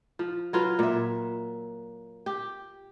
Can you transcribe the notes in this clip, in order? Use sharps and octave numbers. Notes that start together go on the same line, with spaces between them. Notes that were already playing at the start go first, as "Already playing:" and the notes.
F3
F#3 F4 B4
A#2 E5
G4